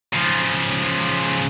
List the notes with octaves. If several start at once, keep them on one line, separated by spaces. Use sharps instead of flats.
C#3 F3